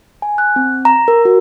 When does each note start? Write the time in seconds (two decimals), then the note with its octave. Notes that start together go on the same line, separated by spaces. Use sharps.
0.22 G#5
0.38 F#6
0.56 C4
0.85 A#5
1.08 A#4
1.25 F#4